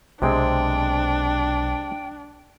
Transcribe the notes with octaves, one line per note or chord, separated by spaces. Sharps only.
B1 C3 G#3 C4 D4 G5